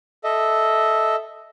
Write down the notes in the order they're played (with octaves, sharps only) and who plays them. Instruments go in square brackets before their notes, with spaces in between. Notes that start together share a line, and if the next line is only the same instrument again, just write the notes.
[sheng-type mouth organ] A4 D#5 E5